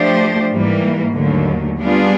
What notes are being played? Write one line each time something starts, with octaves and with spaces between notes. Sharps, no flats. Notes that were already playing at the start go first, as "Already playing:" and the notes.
Already playing: F3 A3 D4 G4 C5
G#2 E3 G3 A#3
D#2 D3 F#3 A3
G3 B3 D4 F4 G#4